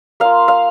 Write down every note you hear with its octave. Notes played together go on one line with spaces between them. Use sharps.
A#3 F4 F5
F5